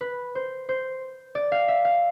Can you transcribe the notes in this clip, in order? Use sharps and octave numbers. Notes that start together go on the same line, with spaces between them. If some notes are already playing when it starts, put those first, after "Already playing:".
B4
C5
C5
D5
F5
E5
F5